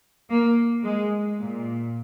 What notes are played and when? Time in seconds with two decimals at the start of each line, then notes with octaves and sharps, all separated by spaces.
0.30 A#3
0.83 G#3
1.38 A#2